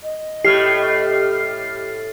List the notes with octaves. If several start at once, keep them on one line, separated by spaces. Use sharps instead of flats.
D#5
A2 A3 G4 F6 C7